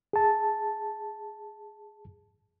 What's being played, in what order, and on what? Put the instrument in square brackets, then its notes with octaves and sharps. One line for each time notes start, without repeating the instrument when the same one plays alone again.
[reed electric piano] G#4 A5